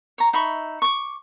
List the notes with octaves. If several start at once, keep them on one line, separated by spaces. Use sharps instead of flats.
C#5 A#5
D#4 E5 B5 C#6
C#6 D6